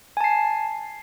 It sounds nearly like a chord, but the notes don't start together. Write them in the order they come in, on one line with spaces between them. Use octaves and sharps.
G#5 A5 C7